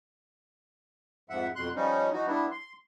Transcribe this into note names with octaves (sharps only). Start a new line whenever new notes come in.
F2 G#2 F3 E5 F#5
F2 B2 C6 F#6
F3 G3 C#4 D#4
E3 D#4 F#4
G3 B3 D4 E4
C6